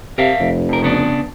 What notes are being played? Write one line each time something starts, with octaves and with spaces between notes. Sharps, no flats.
C3 A#4 E5 F5
F1
F2 A#4
C#3 B3 D4